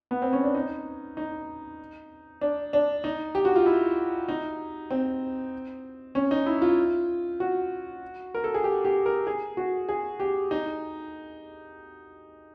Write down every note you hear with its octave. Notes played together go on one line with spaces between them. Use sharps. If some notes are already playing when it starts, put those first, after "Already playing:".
B3
C4
C#4
D4
D#4
D#4
D4
D4
D#4
G4
F#4
F4
E4
D#4
C4
C#4
D#4
E4
F4
F#4
A#4
A4
G#4
G4
G4
A#4
G#4
F#4
G#4
G4
D#4